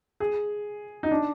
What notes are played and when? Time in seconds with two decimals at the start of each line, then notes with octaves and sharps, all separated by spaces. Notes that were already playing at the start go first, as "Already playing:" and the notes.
0.20 G#4
1.03 D#4
1.11 D4